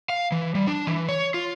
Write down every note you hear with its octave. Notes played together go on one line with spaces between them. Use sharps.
F5
E3
G3
D4
E3
C#5
F4